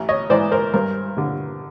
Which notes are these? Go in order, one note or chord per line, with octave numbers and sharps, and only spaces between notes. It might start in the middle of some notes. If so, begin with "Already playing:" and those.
Already playing: A1
C#5 D#5
G#2 E3 C5 D5
A#4 C5
G2 A#4 C5
D3 G3